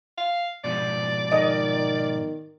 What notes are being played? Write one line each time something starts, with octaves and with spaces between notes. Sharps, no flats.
F5
G#2 B2 F3 D5
D#3 D#5